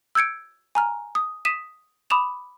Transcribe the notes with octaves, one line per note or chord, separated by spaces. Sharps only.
E6 G6 G#6 C#7 D7
G#5 A#5 F6
D#6
D#6 B6 D#7 E7
B5 D6 D#6 E7 F7